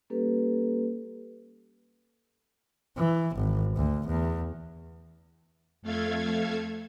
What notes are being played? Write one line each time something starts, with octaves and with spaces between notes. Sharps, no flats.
G3 A#3 C#4 G4 A4 B4
E3
G#1
D2
E2
F2 A3 A4 F5 G#6